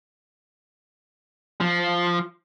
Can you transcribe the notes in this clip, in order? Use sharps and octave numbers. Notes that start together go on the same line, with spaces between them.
F3